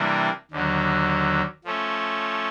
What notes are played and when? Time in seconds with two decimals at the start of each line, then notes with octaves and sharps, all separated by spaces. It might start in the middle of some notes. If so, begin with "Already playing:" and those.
Already playing: C3 E3 G3 A#3 D4
0.51 D#2 D3 F#3
1.64 F3 A3 C#4